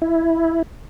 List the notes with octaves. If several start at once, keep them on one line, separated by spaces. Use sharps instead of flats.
E4